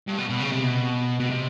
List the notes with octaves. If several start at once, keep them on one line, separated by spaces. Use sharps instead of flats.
G2
B2
B2
C#3
C3
B2
B2
C3